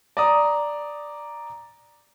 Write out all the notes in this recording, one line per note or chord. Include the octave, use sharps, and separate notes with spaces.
D5 A#5 D#6